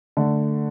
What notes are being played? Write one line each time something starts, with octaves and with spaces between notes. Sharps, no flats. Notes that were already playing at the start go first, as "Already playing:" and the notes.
D3 A3